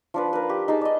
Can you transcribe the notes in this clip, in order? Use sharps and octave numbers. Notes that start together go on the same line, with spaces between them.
F3 D4 B4
A#4 B4
G4
D#4 G#4 A5
D5 D#5